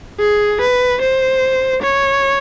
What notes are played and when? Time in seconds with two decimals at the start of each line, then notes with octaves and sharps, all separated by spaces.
0.20 G#4
0.61 B4
1.01 C5
1.82 C#5